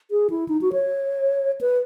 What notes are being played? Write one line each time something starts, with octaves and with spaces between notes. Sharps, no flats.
G#4
E4
D#4
F#4
C#5
B4